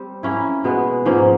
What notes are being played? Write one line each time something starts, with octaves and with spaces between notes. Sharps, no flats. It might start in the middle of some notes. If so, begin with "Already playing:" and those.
Already playing: G3 C4
A#3 C#4 E4
B2 G#3 B3
G#2 F3 A#3 C#4